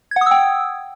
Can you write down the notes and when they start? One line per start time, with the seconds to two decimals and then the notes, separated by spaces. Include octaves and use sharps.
0.11 G#6
0.16 F#5
0.21 D#6
0.26 E6
0.31 G5